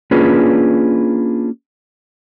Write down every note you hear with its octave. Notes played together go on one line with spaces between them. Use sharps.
A#3 C#4 D4 F4 G#4 B4